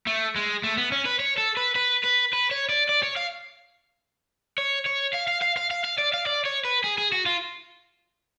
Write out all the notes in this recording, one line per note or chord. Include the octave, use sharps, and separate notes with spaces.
A3
G#3
A3
B3
C#4
B4
C#5
A4
B4
B4
B4
B4
C#5
D5
D5
C#5
F5
C#5
C#5
F5
F5
F5
F5
F5
F5
D5
F5
D5
C#5
B4
G#4
G#4
F#4
F4